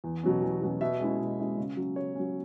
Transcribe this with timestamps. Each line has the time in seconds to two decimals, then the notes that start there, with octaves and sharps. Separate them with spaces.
0.04 E2
0.23 B2 F#3 C#4
0.42 E2
0.61 B2 F#3 C#4
0.81 B2 E5
1.00 G#3 C#4 E4
1.19 B2
1.39 G#3 C#4 E4
1.57 C#3
1.77 F#3 C#4
1.96 C#3 C#5
2.15 F#3 C#4